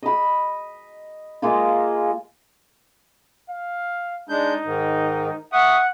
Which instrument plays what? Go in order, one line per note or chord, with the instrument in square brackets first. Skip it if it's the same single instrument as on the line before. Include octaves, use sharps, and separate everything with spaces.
[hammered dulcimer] D#5 B5
G#3 A#3 F4
[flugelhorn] F5
[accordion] G#3 D4 G6 [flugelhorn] D#4
[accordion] G#2 D#3
[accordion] E5 C#6 D#6 [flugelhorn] F#5